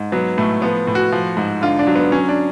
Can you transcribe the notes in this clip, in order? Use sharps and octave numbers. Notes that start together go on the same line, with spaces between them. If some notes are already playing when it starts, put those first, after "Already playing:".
Already playing: G#2
F#3 B3
A2 A3
F3 B3
A2
F#4
F3
G#2
D3 F4
D4
F#3
B3
F#3 C#4
D4